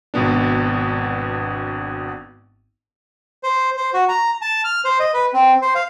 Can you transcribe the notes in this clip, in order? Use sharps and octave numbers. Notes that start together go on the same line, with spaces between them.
G#1 B2 B3 D4
C5
C5
F#4
A#5
A5
F6
C5
D#5
B4
C4
C5
F5